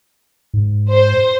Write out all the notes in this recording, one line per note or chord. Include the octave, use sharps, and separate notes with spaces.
G#2
C5